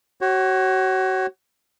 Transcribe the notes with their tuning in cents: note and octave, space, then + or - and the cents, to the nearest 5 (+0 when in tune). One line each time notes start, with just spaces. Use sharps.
F#4 +30 C#5 -25